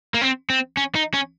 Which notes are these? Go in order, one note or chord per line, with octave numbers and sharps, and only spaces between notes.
A#3
C4
C4
C#4
D#4
C#4